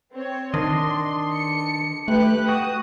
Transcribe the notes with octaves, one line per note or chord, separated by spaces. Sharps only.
C4 C#5
D#3 D4 D#5 C6
C#7
A3 G4 B4 F#6
F#4 D#6